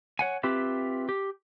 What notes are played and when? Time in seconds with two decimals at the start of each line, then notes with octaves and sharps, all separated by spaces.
0.19 C#5 F#5 G#5
0.43 C4 F4 G4 B4 E5
1.09 G4